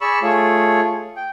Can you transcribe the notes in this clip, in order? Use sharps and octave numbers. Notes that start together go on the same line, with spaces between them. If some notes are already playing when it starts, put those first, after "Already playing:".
G#4 D5 B5 C#6 E6
A3 F4 G#4 C#5
G5